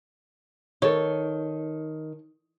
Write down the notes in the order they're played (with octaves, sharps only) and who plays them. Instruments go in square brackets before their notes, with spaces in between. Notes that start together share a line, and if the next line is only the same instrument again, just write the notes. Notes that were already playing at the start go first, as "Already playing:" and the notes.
[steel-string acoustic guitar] D#3 [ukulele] A4 C#5